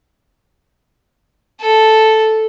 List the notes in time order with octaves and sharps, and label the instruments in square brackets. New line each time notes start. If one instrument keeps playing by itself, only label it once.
[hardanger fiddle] A4